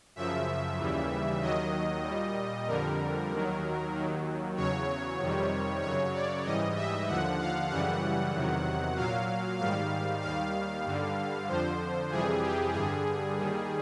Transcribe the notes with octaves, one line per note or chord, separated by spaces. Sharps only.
F#2 C#3 F3 E5
D#2 C#3 E3 G3
D#2 D#3 F#3 D#5
A#2 G3
F2 D3 G3 A#4
D#2 D#3 F#3
D#2 D#3 F#3
E2 C#3 F#3 C#5
F2 C3 D#3 G3
F#2 C#3 F#3 C#5
D5
G#2 E3 G3 D#5
E5
D#2 D3 F3 F#5
F5
F#2 C#3 E3 G3 F#5
E2 C3 D#3 F#3
A#2 F#3 F5
G#2 D#3 G3 F5
D#2 D#3 G3 F5
G2 D3 G3
F2 D3 F3 C5
F2 C3 E3 G3 G#4
G4
G2 D3 G3 G#4
D#2 D#3 G3